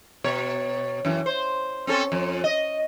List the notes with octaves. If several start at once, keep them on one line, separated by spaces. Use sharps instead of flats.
B2 C#5
F#2 E3
C5
C4 C#4 A4
F2
D#5